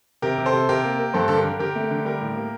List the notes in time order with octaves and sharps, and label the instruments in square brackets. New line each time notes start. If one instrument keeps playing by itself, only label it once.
[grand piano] C3 G4 A#4
C3
A4 C5
C3
C3 G4 A#4
A#3
A#3
G2 A4 C5
D3 A4
G4 A#4
D3
D3 G4 A#4
A3
D3
G3 G4 A#4
A2
A#3